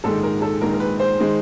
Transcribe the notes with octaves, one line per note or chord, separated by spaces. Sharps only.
A#1 G#2 D#3 G#3 A4
A#4
A4
A#1 G#2 D#3 G#3 A#4
A#4
B4
C5
D#3 G#3